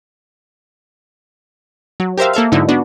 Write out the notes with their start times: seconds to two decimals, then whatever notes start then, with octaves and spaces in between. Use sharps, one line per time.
2.00 F#3
2.18 G4 A#4 C5 E5 F5
2.33 A#3 A4 E5 F5
2.52 G#2 D3 F#3 D#4 E4
2.69 B3 D4 F#4